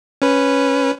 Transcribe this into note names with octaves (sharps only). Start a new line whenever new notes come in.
C#4 B4